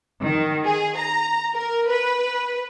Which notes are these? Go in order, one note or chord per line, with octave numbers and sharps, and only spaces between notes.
D#3
G#4
A#5
A#4
B4